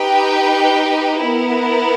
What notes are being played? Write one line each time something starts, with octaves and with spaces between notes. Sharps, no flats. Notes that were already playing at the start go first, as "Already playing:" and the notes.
Already playing: D#4 G4 B4 G5
B3 E4 A#4